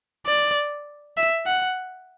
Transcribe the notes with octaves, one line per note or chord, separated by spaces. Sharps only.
D5
E5
F#5